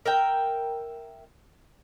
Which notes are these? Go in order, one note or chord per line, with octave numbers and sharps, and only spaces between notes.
A#4 E5 G5